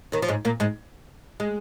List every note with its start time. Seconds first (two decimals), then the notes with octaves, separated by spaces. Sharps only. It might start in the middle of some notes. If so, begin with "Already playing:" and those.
0.12 D#2 D#3
0.22 F3
0.28 G#2 G#3
0.45 A#2 A#3
0.60 G#2 G#3
1.40 G#3